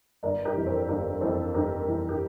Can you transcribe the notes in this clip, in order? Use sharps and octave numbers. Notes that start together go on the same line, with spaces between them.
G1 A#4 D5
G4 A#4
F2 E3
A4 C5
G1 G4 A#4
F2 E3 A4 C5
G1 G4 A#4
F2 E3
G4